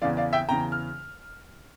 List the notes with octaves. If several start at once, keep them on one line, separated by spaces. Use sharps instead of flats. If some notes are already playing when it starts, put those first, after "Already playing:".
E2 C#3 E3 D5 F5
D5 F5
E5 G5
E2 C#3 E3 G5 A#5
F6